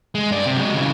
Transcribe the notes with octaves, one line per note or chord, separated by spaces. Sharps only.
G#3
G2 D5
C3
F#3 G#3
C#3 E3